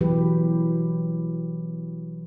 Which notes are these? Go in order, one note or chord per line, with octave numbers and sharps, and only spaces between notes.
B2 E3 F#3 G4 B4